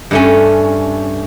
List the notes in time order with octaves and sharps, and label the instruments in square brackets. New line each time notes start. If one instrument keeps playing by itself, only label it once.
[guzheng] G2 A3 C#4